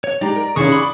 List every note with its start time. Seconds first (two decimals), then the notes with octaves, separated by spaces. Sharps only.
0.04 C#5
0.21 G#3 D#4 G4 D5 A#5
0.36 A#4
0.56 F1 D#3 C#4 G#4 D5 C#6 D#6
0.72 B5 D6